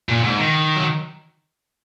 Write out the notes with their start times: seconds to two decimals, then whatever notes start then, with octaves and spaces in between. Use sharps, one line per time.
0.09 A#2
0.23 G#2
0.38 D#3
0.76 F#3